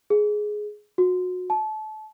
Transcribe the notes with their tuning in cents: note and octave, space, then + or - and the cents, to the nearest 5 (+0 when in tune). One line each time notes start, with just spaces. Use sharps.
G#4 +10
F#4 -25
A5 -30